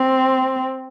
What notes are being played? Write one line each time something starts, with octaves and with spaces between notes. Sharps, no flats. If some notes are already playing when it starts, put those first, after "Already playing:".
Already playing: C4